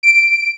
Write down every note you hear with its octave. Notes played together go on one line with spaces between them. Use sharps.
D7